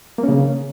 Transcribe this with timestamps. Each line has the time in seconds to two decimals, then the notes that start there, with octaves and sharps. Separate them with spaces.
0.18 A#3
0.23 C#4
0.29 C#3